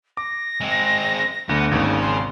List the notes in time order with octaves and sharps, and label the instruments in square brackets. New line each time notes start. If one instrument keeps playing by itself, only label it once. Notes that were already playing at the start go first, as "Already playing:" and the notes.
[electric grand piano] D6 [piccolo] A#6
[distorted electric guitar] G#3 C4
[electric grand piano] D2 D3 [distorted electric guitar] B3
[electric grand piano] G#1 D#2 [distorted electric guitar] C#3
[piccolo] C6